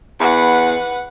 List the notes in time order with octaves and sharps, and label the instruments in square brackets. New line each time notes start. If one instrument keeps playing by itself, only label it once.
[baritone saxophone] E2 [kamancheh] B4 F#5